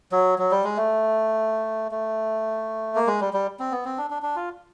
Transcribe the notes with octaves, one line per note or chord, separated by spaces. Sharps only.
F#3
F#3
G3
G#3
A3
A3
A#3
G#3
G3
G3
C4
B3
C4
D4
D4
D4
F4